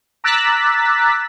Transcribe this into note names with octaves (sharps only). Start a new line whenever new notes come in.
A#5 D6 E6 F#6 A6 B6